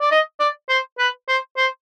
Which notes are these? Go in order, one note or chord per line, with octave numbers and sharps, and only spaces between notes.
D5
D#5
D5
C5
B4
C5
C5